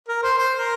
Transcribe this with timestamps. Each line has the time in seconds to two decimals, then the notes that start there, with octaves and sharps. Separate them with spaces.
0.09 A#4
0.23 C5
0.38 C5
0.55 A#4